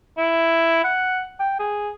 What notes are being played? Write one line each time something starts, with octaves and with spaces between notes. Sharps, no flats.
E4
F#5
G5
G#4